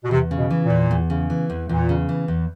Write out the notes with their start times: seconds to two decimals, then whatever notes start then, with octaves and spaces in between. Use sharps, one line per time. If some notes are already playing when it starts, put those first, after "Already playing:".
0.04 B2
0.11 E2 C3
0.31 C#3
0.38 B2
0.50 E3
0.64 A#2
0.70 E2
0.91 E2
1.10 C#3
1.30 E3
1.50 E2
1.69 E2 A#2
1.89 C#3
2.09 E3
2.28 E2